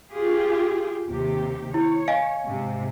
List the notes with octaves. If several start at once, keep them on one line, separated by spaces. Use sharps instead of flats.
F4 G4 G#4
D#2 C3 G4
E4 C#5
D#5 F5 G#5
G#2 C3